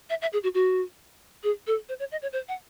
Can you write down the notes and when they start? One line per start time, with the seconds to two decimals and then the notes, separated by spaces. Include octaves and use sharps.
0.10 E5
0.22 E5
0.33 G#4
0.43 F#4
0.54 F#4
1.44 G#4
1.67 A4
1.89 C5
2.00 C#5
2.12 D#5
2.22 C#5
2.33 C5
2.48 F#5